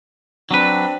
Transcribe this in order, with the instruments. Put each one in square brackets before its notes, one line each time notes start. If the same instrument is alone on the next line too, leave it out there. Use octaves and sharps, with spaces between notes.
[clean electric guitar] F#3 B4 [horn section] C4 D4